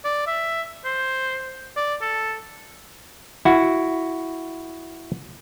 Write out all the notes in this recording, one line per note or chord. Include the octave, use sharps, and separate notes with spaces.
D5
E5
C5
D5
A4
E4 F#4